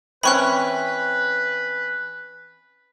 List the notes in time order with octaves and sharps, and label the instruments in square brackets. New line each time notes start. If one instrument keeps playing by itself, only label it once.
[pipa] E3 C4 C#4 [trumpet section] B4 [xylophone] B5 C#6 F#6